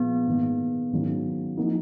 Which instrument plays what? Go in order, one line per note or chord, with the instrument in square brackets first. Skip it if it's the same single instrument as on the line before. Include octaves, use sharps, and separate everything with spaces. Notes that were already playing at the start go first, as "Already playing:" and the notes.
Already playing: [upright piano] A#2 F3 G#3 [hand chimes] B3
[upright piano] G#2 D#3 A#3
G#2 D#3 F#3 C#4
F3 A#3 D#4